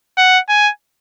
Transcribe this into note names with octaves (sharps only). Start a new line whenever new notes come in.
F#5
G#5